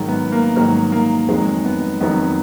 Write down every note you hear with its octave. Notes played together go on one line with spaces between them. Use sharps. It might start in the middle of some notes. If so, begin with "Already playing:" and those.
Already playing: G#2 D#3 F#3
B3
A#3
G#2 D#3 F#3 A#3
A#3
F2 D#3 F#3 G#3
B3
F2 D#3 F#3 B3